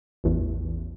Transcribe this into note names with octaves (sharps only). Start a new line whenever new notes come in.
A1 E2